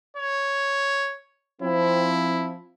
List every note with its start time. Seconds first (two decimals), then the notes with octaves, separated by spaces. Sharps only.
0.17 C#5
1.62 F3 C4 E4